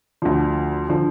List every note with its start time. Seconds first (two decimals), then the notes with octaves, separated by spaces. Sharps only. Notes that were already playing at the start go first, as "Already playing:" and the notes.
0.22 D2 D3 F3
0.89 D3 F3